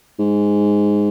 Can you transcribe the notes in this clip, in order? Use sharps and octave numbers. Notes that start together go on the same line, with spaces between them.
G#2